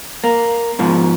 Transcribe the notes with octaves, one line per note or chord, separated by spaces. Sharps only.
A#3
G#2 B2 F3